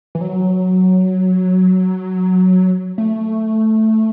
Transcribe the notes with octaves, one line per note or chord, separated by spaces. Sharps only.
E3
F#3
A3